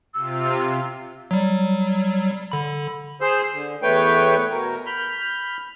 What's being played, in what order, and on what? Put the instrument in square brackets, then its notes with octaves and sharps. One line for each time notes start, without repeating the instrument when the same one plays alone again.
[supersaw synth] C3 F4 [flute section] E6
[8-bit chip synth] F#3 G3
D3 B5
[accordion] G#4 C5 C6 E6
D3
E2 A3 B4 C#5 G5
B2 A#4
B5 F6 G6